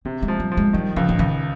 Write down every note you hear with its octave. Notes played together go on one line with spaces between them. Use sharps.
C3 C4
G#3
F3
G3
F3
G#3
D#3 G3
C#2 F3
C#3
C#2 D#3